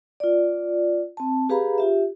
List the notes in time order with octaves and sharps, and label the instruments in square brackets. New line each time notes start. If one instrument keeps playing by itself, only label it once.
[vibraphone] F4 D5
C4 A5
G4 G#4 B4 F5 A#5 B5
F4 G4 E5